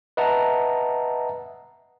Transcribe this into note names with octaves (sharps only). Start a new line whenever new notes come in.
B4 D#5 E5 F#5 A5 A#5